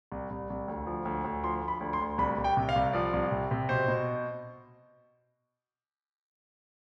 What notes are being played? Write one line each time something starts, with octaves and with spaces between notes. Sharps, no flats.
C2
C2
C2
D2
F3
D2
D2
F3 C6
F3
B5
D2
C6
D2
C2 B5
C2
G5
C3
F5
C2
F3 D5
C2
C3
C3
B2 C5
B2